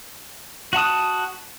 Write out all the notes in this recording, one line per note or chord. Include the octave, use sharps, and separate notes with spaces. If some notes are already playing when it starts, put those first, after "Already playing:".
F#4 F#5 A5 D#6